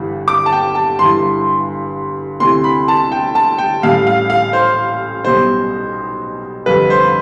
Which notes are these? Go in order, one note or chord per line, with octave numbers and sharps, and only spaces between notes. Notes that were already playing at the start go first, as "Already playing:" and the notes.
Already playing: G1 G2 E3 G3
D6
A5
G5
A5
G1 G2 E3 C6
D2 C3 E3 C6
B5
A5
G5
A5
G5
A1 A2 G3 F5
F5
F5
C5
B1 B2 G3 C5
G1 F2 C3 G3 B4
C5